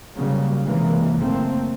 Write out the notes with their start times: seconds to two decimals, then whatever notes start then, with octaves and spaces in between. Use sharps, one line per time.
0.16 C#3 F#3 G3 A#3
0.64 C3 D#3 E3 G#3 A#3
1.17 F#1 A3 A#3 C4